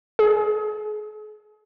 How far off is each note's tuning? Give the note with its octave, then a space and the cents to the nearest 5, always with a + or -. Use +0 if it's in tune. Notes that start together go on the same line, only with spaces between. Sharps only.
G#4 +40